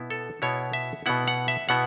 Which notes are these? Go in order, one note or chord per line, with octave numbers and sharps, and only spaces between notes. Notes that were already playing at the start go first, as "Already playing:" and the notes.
Already playing: B2 B3 E4
A4
B2 B3 E4 C#5
E5
B2 B3 E4 F#5
F#5
E5
B2 B3 E4 F#5